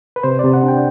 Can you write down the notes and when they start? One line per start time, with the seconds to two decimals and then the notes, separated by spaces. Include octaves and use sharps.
0.16 B4
0.23 C3 C5
0.39 C3 D5
0.54 F#5
0.63 D4
0.68 G5